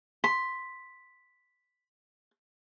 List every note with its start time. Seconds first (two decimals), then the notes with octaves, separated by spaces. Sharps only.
0.24 C6 B6